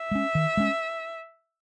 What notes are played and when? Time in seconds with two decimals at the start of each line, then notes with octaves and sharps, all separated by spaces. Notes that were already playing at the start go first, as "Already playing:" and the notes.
Already playing: E5
0.11 G#3 C#4
0.35 D#3
0.57 G#3 C#4